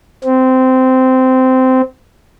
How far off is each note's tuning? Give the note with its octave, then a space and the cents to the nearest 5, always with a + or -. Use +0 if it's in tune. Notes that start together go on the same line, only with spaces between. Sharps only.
C4 -15